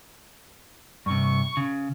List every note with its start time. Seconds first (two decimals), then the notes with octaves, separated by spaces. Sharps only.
1.06 G2 C3 C#6
1.57 C#3